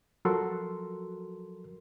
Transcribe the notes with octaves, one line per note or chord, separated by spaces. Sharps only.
F3 F#3 F#4 A4 A#4 C6